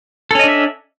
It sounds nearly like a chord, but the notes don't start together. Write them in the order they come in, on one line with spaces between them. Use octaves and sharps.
A4 C#4 D#5 D4 E5